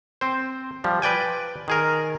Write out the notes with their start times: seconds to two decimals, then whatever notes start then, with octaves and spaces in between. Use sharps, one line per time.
0.21 C4 C5
0.84 F3 G3
1.02 B4 D5 G5 G#5
1.68 D#3 G#4 A#4